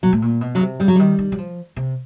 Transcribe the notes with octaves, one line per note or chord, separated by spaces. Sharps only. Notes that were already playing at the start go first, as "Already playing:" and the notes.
B2 F#3
A2
A#2
B2
C#3 F#3
C3
C#3 G3
F#3
D#3 G3
D#3
F#3
F3
C3